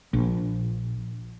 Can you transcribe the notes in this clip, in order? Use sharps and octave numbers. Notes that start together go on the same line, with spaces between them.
A#1